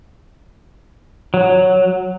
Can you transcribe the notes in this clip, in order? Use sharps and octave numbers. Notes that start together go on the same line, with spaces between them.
F#3